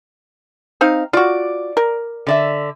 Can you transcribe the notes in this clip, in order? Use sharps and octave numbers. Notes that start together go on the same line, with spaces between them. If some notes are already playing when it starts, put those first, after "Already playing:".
C4 D#4 F5
F4 F#4 D5
A#4
D3 D5 E5